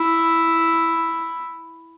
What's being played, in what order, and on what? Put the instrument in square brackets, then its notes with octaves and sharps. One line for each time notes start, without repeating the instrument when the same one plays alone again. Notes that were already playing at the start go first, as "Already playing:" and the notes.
Already playing: [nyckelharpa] E4